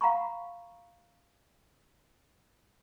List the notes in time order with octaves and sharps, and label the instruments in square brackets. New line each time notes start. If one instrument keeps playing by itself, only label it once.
[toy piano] F5 F#5 A#5 B5 C#6